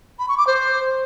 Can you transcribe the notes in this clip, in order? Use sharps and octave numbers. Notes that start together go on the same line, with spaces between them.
B5
C#6
D6
C5